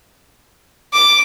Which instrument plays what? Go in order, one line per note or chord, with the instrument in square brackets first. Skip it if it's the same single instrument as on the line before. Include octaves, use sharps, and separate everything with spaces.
[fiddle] D6